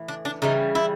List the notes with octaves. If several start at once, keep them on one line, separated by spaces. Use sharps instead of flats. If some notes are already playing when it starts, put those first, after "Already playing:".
Already playing: A2 E3
D4
D4
C#3 E3 G3 D#4
E4